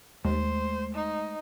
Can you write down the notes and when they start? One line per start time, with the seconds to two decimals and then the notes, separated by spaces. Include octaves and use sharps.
0.25 D#2 G#3 A3 C5
0.95 D#4